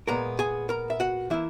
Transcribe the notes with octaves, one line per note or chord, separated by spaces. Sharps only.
A#2 G#3 B3 A#4 A#5
G#4 G#5
A#4 A#5
E5
F#4 F#5
E3 A#3 E4 E5